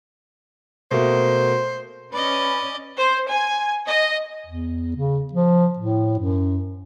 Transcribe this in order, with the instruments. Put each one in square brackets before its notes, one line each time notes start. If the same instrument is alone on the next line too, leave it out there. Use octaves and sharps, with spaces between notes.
[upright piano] B2 A3 A#3 [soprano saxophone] C5
[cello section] C#4 [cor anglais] B4 [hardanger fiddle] D5 D#5
[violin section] C5
G#5
D#5
[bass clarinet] E2
C#3
F3
A2
F#2